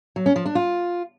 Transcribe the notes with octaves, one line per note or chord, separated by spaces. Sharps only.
F#3
C#4
F3
D4
F4